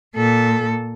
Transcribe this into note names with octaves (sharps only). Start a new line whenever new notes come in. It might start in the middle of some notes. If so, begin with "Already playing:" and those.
A#2 A4